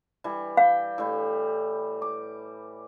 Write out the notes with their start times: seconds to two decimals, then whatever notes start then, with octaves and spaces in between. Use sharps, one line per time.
0.24 E3 G3
0.57 F5 G5
0.98 A2 G3
2.02 D6